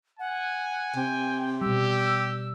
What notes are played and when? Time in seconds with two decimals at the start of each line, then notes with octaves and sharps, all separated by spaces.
0.19 F#5 G#5
0.96 C3 G5
1.61 B2 G3 G4 E6